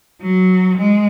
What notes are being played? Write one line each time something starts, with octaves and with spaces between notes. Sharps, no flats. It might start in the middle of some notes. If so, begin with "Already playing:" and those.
F#3
G#3